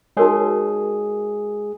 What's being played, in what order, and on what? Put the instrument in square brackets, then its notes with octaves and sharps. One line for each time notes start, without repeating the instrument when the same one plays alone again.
[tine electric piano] G#3 G#4 [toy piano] D#4 F#4 A#4 C#5